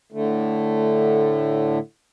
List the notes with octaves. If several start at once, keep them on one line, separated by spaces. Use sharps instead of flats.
A2 D3 A3